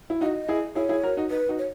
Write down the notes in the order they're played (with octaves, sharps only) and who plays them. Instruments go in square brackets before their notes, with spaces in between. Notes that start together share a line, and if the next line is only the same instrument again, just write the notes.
[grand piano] E4
[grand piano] D#4 F#4 [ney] F5
[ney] D#5
[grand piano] E4 G#4
[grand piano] E4 G#4 [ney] C#5
[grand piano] E4 G#4
F#4 A#4
D#4 F#4
[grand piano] D#4 [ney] B4
[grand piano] D#4 F#4
[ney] C#5